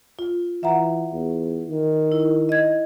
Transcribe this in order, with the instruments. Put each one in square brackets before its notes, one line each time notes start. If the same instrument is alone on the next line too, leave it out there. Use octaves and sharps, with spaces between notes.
[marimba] F4
[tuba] E3 [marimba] E5 F#5 A#5
[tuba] E2
D#3
[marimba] E4
D#5 G#6